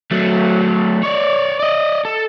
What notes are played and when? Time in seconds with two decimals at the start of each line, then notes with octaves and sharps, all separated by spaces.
0.11 F#3 A3
1.03 C#5 D5
1.60 D5 D#5
2.05 A4